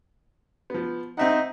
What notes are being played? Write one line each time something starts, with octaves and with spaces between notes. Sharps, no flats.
F3 B3
C4 D#4 E5 F#5